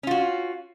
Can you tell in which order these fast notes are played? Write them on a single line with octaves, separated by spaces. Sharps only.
C#4 F4 F#4